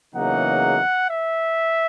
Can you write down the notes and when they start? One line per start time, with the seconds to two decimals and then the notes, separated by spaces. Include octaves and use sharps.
0.15 E2 C#3 F#3 A#3 D#4 F#5
1.09 E5